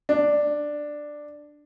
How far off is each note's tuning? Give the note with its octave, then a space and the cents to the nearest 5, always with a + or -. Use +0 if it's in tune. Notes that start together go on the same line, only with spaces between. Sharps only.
D4 +5